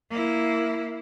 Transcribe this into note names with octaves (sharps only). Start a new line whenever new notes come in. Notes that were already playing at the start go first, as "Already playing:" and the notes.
A#3 E4